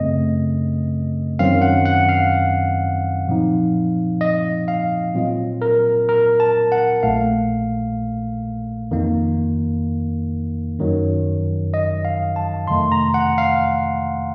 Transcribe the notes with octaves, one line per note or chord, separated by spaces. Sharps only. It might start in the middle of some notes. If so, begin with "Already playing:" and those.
Already playing: F#2 C#3 A3 C4 D#5
F#2 D#3 F#3 C4 F5
F#5
F#5
F5
A#2 F3 C4 D#4
D#5
F5
A#2 F#3 C4 F4
A#4
A#4
A5
F#5
A#1 A#2 A3 F5
F2 D#3 A#3
F#2 D#3 F#3
D#5
F5
A5
F2 C3 D#3 A3 C6
A#5
F#5
F5